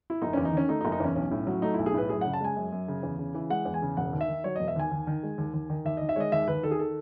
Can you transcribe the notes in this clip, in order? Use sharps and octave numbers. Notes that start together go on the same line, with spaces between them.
E4
F#1 D#4
E2 C#4
D#4
D#3 C#4
A3 D#4
D#4
F#1
D#4
E2 C#4
B1 C#4
A2
F#3
A3 D#4
B1 E4
G#4
A2 B4
F#2 G#4
C#3 F#5
A5
G#3 G#5
F#2
F#2
C#3
E2
C#3
E3
G#3 F#5
E2
G#5
C#3
E1 F#5
D#2
E5
D#3
F#3 C#5
E1 D#5
E5
D#2 G#5
D#2
D#3
G#3
D#2
D#2
D#3
D#2 E5
D#3 D#5
E5
G#3 C#5 D#5
D#2 E5
D#2 B4
D#3 A4
G#4
A4